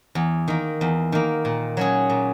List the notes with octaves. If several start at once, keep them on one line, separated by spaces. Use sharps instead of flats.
E2
D#3 A#3
E2
D#3 A#3
A#2
F#3 C#4 G#4
A#2